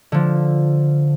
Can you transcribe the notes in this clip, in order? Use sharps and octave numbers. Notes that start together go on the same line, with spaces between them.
D3 F3